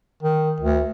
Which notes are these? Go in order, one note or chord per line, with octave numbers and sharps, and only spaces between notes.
D#3
D2